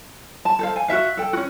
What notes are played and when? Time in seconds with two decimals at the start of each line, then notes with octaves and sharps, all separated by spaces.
0.45 A5
0.59 A4 C5 F5
0.76 G#5
0.88 F#4 A#4 E5 F5
1.17 A4 G5
1.33 C#4 F#4